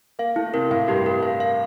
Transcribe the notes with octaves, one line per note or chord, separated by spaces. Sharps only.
A#3 F5
A3 E4
C3 A#4
A2 F5
G2 G4
A#4
F5
F5